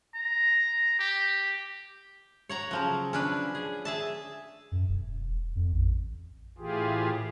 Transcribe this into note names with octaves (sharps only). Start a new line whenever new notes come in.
A#5
G4
C#5 F#5 A#5
C#3 F3 F#3
C#4 D4 B4
G#4
G#4 E5 A5
F#2
E1
F2
A1
A2 E3 F4 G4 G#4